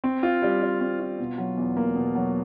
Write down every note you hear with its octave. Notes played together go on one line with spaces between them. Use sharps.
C4
F4
G3
G3
C4
F4
B2
F#3
E2
A#3
B2
F#3